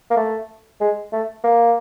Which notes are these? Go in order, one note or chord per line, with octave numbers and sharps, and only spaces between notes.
A#3
A3
G#3
A3
A#3